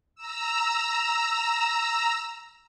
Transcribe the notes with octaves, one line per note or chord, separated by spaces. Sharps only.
A#5 E6